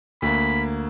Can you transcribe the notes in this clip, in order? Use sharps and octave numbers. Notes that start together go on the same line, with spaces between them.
D2 A#3 B5